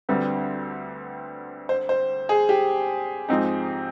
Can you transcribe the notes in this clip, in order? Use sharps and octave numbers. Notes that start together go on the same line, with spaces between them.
D2 D3 G3 C4 B4
C5
C5
G#4
G4
G#2 F3 C4 D#4